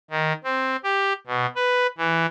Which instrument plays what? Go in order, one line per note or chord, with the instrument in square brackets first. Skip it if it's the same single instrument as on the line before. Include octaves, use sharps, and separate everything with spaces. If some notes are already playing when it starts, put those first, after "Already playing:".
[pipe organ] D#3
C4
G4
B2
B4
E3